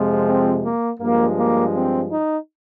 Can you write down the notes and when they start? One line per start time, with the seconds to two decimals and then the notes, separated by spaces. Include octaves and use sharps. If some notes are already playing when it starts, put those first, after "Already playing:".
Already playing: F2 C3 F3 G#3
0.27 C4
0.63 A#3
1.00 G2 F3 G#3 A#3
1.37 A#3
1.74 C4
2.11 D#4